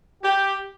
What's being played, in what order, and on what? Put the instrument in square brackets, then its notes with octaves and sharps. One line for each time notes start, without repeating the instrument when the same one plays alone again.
[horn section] G4